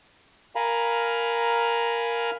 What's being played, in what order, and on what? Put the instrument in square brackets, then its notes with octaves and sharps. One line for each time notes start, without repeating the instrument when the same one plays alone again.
[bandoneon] A#4 F5 G#5 A#5 B5